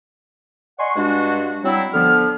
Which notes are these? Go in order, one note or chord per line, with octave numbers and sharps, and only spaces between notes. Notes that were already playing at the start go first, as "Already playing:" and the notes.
D5 D#5 F#5 G#5 C6 C#6
G2 G#3 D4 F#4
F#3 G3 C4 E4
D3 F3 B3 F6